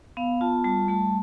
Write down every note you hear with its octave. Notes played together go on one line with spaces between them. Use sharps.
B3 F5
F4 A5
G3 A5
A3 A5